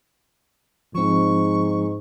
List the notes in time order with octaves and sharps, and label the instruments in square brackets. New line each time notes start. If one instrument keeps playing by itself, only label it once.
[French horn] G#2 [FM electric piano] F3 C4 [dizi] C#6